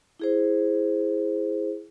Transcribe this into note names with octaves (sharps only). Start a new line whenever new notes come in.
E4 G#4 C5